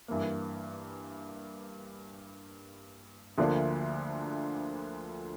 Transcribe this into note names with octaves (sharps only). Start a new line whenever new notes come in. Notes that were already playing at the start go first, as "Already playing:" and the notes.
G2 E3 A#3
D2 D3 F3 A#3 D4